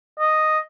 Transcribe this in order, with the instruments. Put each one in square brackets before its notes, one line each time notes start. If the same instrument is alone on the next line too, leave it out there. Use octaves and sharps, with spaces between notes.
[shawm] D#5